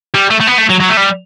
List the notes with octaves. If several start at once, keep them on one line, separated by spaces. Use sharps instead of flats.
G3
A3
A3
B3
A3
F#3
F#3
A3
G3